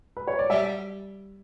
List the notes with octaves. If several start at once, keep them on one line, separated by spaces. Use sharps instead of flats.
B4
C#5
D5
G3 E5